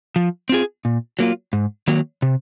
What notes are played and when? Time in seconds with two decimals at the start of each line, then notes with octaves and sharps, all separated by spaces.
0.16 F3
0.49 C4 F4 G#4
0.85 A#2
1.19 F#3 A#3 F4
1.53 G#2
1.88 D#3 F#3 A#3
2.22 C3